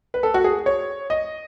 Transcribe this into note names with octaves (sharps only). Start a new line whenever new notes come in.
B4
A4
F#4
G#4
C#5
D#5